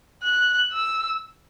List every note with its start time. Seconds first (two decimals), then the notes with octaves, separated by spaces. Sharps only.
0.23 F#6
0.72 E6